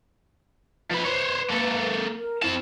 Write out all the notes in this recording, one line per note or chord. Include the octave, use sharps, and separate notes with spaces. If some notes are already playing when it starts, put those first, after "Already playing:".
F3 B4 B5
C5 C#5
A#3 A4
A#4
C4 E4 A5